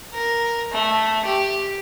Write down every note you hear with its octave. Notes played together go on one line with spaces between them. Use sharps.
A#4
A3
G4